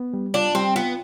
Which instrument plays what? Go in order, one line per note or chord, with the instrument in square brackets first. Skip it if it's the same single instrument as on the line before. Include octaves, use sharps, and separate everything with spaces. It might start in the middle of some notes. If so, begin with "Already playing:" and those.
Already playing: [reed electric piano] B3
G3
[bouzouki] D4 [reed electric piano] F4
[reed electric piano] G3 [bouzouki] C4
[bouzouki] B3 [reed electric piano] F4